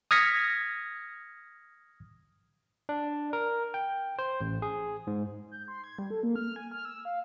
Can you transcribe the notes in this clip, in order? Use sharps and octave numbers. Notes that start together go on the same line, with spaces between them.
D#6 F6 G#6 A#6 B6 C#7
D4
A#4
G5
C5
A1
G#4
G#2
G6
C6
G#6
G3
A4
A#3
F6
G#5
F6
E6
F5